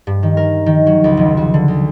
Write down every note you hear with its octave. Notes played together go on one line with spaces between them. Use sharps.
G2
D#3
A#4
D#3
F#3
C#2
F1
F#4
D3
D2